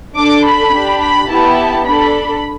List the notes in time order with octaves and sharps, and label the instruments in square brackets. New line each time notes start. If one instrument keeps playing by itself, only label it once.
[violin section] D4 A4 D6
B5
D4 G4
B5
B3 E4 G4 A5
D4 A4 B5